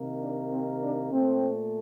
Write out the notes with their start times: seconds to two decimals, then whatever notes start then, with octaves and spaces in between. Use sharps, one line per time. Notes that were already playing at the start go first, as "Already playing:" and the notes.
Already playing: C3 D#3 A#3
0.21 D4
0.51 C4 D#4
0.81 D4
1.11 A#2 A3 C4